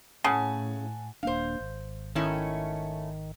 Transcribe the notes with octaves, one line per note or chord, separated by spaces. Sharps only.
A2 C#3 F#5 G#5 A5
D#1 A#3 D4 C5 F5
G#1
D#3 A3 C#4 E4